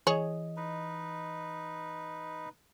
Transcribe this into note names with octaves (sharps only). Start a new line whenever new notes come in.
E3 G#4 C#5 D#5
D#4 B4